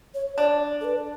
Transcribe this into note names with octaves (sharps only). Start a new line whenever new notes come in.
C#5
D4 D5
A4
B4